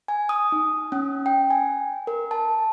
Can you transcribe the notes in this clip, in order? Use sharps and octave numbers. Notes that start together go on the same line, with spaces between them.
G#5
D#6
D#4
C#4
G5
G#5
A#4
A5